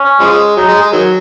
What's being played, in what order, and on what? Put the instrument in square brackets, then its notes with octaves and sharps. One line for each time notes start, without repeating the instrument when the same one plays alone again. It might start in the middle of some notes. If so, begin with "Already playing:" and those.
Already playing: [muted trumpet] C#4
[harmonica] C#3 F3 G#3
[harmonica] F#3 [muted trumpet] D#4
[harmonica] G#3
G#3
D#3 F#3